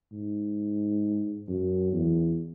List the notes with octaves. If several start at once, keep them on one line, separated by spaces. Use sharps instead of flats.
G#2
F#2
E2